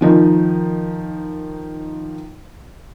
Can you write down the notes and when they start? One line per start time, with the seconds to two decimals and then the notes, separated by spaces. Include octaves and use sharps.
0.01 D#3 F3 D#4